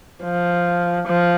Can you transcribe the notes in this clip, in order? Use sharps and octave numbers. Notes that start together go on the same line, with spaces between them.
F3
F3